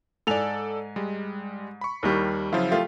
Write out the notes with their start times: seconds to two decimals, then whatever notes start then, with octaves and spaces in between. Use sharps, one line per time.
0.27 G#2 A4 D5 G#5 F7
0.96 G3 G#3
1.81 B5 C#6
2.03 D#2 D#3 G3
2.52 C#3 F3 F#3 E4 F4
2.71 A3 F4 G4